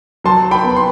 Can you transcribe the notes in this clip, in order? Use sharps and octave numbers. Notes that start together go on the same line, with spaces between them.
F#3 A5 C6
G5 B5
B3
C6